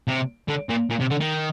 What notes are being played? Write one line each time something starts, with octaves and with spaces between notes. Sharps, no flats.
C3
D3
A#2
A#2
C3
D3
D#3